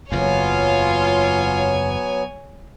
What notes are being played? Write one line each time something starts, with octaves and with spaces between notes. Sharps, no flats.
F#1 E2 F#3 B3 F4 C#5 G#5